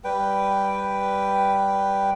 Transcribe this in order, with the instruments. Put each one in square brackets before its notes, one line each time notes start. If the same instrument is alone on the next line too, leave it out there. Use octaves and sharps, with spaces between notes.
[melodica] G3 B4 G5